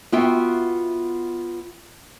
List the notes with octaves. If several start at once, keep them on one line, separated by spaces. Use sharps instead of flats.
B3 F4 F#4 E5 G5